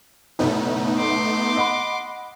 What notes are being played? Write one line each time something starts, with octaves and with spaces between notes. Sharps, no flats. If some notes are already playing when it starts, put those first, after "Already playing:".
F#1 B1 A3 B3 D#4
C6 D6
D#5 F#5 B5